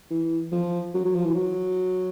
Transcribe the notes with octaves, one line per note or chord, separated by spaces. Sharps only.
E3
F3
F#3
F#3
F3
E3
F#3